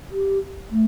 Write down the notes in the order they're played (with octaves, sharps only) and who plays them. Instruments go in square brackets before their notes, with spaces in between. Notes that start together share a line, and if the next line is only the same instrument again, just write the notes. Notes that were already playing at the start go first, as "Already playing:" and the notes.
[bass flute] G4
A3